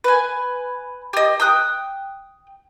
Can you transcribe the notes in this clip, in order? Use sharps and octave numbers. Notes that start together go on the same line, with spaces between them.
B4 G#5
G4 D#5
G5 D#6 F#6